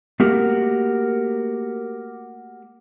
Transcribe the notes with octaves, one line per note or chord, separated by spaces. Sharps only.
A3 A#3 F#4 G4 A#4